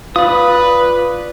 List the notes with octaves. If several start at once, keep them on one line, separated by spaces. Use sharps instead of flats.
F4 B4 D5 D#6